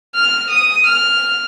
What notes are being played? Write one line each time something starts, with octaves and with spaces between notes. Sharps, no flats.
F6
D#6
F6